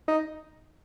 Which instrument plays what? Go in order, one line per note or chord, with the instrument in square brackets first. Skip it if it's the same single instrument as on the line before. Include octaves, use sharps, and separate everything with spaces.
[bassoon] D#4